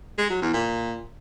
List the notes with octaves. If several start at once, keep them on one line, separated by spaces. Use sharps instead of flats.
G#3
F#3
E2
A#2